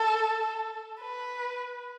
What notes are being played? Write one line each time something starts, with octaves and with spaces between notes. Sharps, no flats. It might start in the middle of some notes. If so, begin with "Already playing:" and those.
Already playing: A4
B4